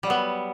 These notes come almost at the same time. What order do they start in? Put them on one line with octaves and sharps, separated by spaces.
G3 F#3 B3